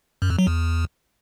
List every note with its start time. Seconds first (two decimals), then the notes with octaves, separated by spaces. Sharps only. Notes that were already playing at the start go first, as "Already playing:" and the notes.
0.22 F#2
0.30 F2
0.39 F#3
0.47 E2